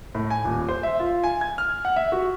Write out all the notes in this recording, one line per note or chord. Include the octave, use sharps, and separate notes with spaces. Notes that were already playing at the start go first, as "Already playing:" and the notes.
A2
G#5
D#1
C5
E5
F4
G#5
G#6
F6
F#5
E5
F#4